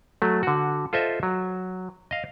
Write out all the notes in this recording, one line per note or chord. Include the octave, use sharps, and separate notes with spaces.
F#3 A3
D3 F#4
F4 A4 C5 D#5 E5
F#3
D#5 F5